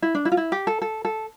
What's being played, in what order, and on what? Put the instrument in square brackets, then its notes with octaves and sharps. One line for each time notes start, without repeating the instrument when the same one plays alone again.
[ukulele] E4
D4
E4
F4
E4
G4
A4
A4
A4